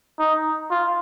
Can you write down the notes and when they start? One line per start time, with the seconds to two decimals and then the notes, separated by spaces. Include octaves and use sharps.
0.19 D#4
0.71 F4